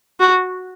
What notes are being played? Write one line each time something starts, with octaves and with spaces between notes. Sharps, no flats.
F#4